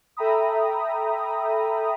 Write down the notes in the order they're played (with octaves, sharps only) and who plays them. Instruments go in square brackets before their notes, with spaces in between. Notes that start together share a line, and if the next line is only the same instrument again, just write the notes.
[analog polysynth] A4 E5 G5 A#5 B5 D#6